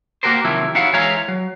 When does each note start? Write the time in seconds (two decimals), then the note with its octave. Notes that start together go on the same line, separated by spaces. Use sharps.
0.23 A#3 C4 F#4 G4 A#4 C5
0.44 C3 D#3 F3 F#3 A#3 E4
0.75 D#4 E4 F#4 C#5 F5 F#5
0.93 E3 G#3 C#5 E5 F5 A#5
1.28 F#3